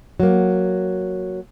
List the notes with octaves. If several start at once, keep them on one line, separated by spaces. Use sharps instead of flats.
F#3 A#3